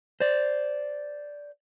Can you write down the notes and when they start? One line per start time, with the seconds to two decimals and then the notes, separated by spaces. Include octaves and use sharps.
0.20 C5 D5